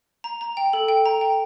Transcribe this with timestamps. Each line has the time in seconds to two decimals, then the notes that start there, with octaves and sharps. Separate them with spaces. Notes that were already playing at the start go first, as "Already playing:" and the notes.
0.24 A#5
0.41 A#5
0.57 G5
0.73 A4
0.88 G5
1.06 A#5
1.21 G5